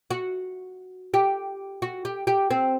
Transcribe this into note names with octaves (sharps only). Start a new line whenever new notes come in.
F#4
G4
F#4
G4
G4
C4